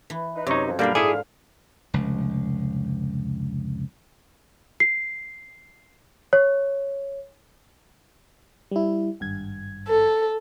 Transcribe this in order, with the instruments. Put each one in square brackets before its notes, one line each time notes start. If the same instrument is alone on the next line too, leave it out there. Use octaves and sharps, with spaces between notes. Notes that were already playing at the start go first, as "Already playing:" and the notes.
[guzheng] E3
[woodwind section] D#4 B4
[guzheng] F#2 [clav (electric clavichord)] C3 D#4 [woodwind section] C#5
[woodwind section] F2
[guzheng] A#2 C5 B5 [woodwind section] D3 F5 [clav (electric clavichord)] G3 A#3 D4
[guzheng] G#2 [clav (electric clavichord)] E4 A4 D5 [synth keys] G#4
[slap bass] F1 C#2
[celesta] C7
C#5
[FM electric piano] G3 E4
G#1 G2 G#6
[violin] A4